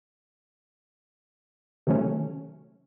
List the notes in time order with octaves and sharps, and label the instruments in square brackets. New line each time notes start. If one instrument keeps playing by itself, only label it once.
[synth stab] C3 D#3 F#3 A3 C#4